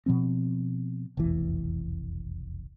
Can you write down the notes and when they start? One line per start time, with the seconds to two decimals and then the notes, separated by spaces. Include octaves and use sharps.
0.06 B2 F3 C4
1.17 F1 B1 E2 E3